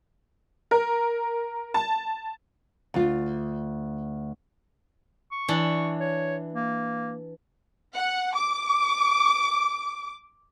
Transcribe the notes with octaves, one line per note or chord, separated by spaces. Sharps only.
A#4
A5
D2 F4
C#6
E3 D4 B5
C#5
A#3
F#5
D6